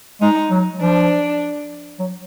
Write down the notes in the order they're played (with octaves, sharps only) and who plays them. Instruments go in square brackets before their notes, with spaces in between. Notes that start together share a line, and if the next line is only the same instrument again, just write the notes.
[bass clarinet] G#3 [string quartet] D#4
[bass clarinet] F#3
[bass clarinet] F3 [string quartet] D4
[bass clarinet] F#3